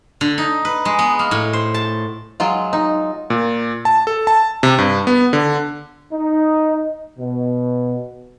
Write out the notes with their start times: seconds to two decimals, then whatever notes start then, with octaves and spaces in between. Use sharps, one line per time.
0.21 D3
0.38 D#4
0.65 B4
0.85 G#3
0.99 B3
1.19 A#3
1.31 A2
1.53 C5
1.74 A5
2.40 F#3 G#3 F4
2.73 D#4
3.30 A#2
3.85 A5
4.07 A4
4.27 A5
4.63 C3
4.78 G2
5.07 B3
5.33 D3
6.12 D#4
7.19 B2